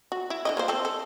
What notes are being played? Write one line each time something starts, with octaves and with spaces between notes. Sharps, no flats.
F#4
E4
D3 E4 D#5
A#3 F4 C5
C4 A4
A4